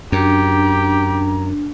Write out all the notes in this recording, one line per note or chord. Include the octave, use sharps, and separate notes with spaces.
F#2 D4 G4 A#5